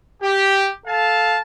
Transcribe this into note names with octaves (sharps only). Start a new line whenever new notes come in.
G4
A4 F5 A5